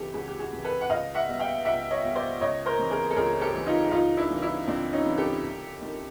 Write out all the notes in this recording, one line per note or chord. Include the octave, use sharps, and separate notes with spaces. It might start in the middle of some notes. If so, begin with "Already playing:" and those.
Already playing: C#2 C3 E3 G4 A4
C#2 F#4 G#4
G4
F#4 G#4
C3 E3
A4 B4
F#5
C#2 D#5 F5
E5 F#5
B2 G3
F5 G5
C#2 E5 F#5
C#5 D#5
B2 G3
C5 D5
C#2 C#5 D#5
A#4 C5
C3 E3
G#4 A#4
A4
C#2 G#4 A#4
G4 A4
C3 E3
D#4 F4
C#2 D#4 F4
D4 E4
C3 E3 G3
D4 E4
C#2 C4 D4
C#4 D#4
C3 E3 G3
G4 A4
C2
C3 D#3